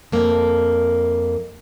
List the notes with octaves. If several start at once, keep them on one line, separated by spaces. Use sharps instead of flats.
F2 A#3